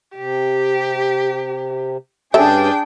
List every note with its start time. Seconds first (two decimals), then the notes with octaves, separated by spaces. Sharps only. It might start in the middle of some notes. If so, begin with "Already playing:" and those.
0.16 C3 G4
2.34 G2 G3 C#4 D4 G#4 A4 E5 G5